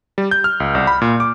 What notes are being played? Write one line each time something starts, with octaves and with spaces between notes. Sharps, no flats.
G3
G6
F6
C#2
C2
B5
A#2
D6